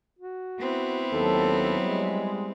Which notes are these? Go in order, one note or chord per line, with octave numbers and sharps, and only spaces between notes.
F#4
B3 C4 E4
D#2 F#3 A4
G3 G#3